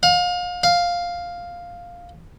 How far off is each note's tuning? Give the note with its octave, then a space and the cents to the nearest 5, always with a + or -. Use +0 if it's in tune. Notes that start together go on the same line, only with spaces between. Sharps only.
F5 +35
F5 +5